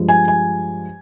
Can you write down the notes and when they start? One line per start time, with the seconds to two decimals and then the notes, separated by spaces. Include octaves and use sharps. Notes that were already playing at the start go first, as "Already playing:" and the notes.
Already playing: G2 F3 G#3
0.09 G#5
0.28 G#5